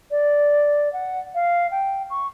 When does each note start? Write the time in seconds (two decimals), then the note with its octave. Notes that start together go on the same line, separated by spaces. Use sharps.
0.11 D5
0.93 F#5
1.35 F5
1.71 G5
2.10 C#6